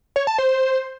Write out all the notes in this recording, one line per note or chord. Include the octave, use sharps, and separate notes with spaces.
C#5
A5
C5